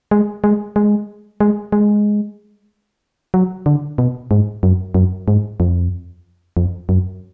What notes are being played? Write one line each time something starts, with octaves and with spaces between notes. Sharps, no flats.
G#3
G#3
G#3
G#3
G#3
F#3
D3
B2
G#2
F#2
F#2
G#2
F2
F2
F#2